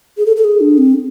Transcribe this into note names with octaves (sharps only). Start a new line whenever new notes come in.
G#4
A4
A4
G#4
D4
C4